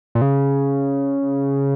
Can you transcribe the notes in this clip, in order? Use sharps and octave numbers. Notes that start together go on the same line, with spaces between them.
A#2
C#3